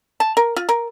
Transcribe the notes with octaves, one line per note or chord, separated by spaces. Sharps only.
A5
A#4
F4
A#4